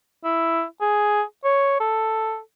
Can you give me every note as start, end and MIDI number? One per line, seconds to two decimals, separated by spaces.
0.24 0.64 64
0.81 1.22 68
1.44 1.76 73
1.80 2.40 69